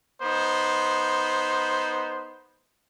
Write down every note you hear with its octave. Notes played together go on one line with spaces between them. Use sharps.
B3 D#4 C5